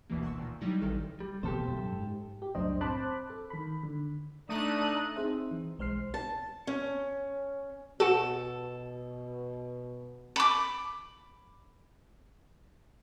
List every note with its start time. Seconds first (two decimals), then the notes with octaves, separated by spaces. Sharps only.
0.10 G1 D2 B2 E3 A#3
0.23 F#5 A5 C6 C#6 E6
0.38 A#2 D#3
0.61 F#3 G3 D#4 E4
0.81 A1 D2 C3 D#3 A4 F6
1.20 G3
1.43 B2 E3 A#3 G4 A4 C5
1.68 F#2
1.92 G#2
2.42 G4
2.55 C2 F#2 A2 D4 C5 D#5
2.81 C4 C5 A5 B5 D6 F#6
3.30 A4
3.50 D#3 B5
3.83 D3
4.49 A3 D4 D#4 D#6 F#6 D#7
5.16 C4 D#4 G#4 C5 E5
5.51 E3
5.78 B1 G#3 C5 F6 C7
6.14 A5
6.67 C#4
8.00 B2 F#4 A4 F#5
10.36 B5 D6